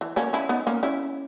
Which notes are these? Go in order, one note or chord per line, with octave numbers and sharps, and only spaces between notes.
E3
A#3 C#4
C#4 E4
B3 D#4
A#3 C#4
C#4 E4